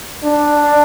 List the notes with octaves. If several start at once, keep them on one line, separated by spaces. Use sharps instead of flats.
D4